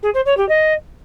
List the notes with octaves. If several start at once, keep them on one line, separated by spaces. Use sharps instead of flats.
G#4
C5
C#5
G4
D#5